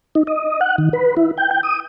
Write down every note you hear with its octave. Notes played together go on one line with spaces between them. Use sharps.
D#4
D#5
F#5
D#3
B4
E4
G5
G5
D#6